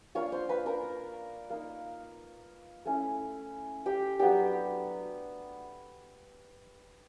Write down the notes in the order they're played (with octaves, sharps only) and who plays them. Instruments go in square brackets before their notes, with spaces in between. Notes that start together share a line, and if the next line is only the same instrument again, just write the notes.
[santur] A#3 D4 F4 C#5 C#6
C5 C6
B4 B5
A#4 A#5
A#3 D#4
A3 C#4 E4
G4 G5
F#3 B3 D4 G4 G5